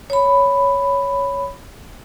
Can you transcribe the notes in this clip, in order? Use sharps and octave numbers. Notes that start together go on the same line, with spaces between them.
C#5 B5